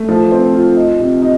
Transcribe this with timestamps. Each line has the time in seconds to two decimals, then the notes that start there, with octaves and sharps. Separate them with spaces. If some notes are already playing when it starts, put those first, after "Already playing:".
Already playing: A3
0.09 F3
0.31 C4
0.54 F4
0.76 D#4
1.00 C3
1.22 D#4